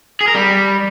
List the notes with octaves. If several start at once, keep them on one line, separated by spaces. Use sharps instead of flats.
G#4
A#4
G3